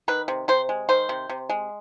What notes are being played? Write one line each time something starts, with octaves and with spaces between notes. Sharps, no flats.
D#3 B4
C3
C3 C5
G#3
D#3 C5
C3
C3
G#3